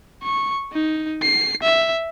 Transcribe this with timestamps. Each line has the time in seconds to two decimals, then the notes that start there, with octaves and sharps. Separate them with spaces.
0.23 C#6
0.72 D#4
1.22 C7
1.63 E5